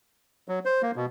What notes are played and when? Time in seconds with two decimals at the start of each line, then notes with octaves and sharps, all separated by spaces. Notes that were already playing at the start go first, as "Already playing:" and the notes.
0.48 F#3
0.65 C5
0.83 A#3
0.96 B2